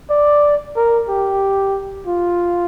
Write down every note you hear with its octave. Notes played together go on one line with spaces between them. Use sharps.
D5
A#4
G4
F4